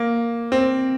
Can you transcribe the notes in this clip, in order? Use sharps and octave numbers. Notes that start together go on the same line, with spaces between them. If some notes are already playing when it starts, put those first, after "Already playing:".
Already playing: A#3
C4